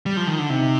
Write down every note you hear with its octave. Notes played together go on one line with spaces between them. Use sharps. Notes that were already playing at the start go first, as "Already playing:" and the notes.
G3
F3
D#3
D3
C3 D#4